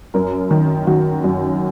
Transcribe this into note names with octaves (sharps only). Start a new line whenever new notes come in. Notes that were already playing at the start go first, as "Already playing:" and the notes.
F#2 A#4
D#3
D#3 F#4
F#2